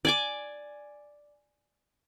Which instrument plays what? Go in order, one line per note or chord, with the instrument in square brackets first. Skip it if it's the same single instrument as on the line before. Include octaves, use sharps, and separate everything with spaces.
[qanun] D5 G#5 D6